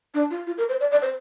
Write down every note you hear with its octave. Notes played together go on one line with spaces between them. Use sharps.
D4
F4
F4
A#4
C5
D5
D5
C5